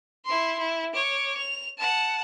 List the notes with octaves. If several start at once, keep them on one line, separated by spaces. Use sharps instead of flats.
E4 C6
E4
C#5 D6
F7
F#5 A5